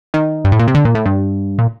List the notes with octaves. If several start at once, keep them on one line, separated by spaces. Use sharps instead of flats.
D#3
G2
A2
A#2
C3
D3
A#2
A2
G2
A#2